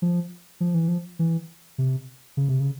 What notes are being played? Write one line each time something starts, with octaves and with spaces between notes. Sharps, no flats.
F3
F3
E3
F3
E3
C3
C#3
C3
C#3